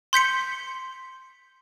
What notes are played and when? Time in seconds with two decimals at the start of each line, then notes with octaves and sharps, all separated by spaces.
0.13 C6 G6 B6 C#7